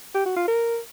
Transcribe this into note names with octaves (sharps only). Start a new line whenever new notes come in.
G4
F#4
F4
A#4